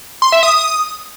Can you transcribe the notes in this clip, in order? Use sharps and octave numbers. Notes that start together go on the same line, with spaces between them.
C6
E5
D#6
D#6